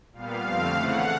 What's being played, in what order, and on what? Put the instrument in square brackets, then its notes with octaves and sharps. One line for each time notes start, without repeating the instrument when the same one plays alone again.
[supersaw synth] A#2 G3 B3 F5
F2 D3 F3 A3 C4
C#3 E3 A3 F#5